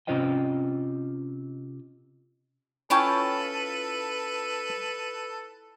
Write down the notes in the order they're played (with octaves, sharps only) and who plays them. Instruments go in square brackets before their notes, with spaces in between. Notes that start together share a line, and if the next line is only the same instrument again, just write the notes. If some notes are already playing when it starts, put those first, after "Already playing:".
[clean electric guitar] C3 C#4 F4 C5 D#5 G5
[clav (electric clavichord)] C#4 C#5 G5 [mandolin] E4 F4 A5 [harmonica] A4 B4